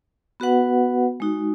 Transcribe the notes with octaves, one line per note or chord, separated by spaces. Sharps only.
B3 F#4 B4 F#5
G#3 D#4 F#4